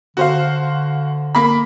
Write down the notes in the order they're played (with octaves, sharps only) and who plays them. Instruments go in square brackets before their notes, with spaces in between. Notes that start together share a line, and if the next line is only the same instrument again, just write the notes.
[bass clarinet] D3 [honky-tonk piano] F#4 C5 F5
[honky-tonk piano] A#3 B5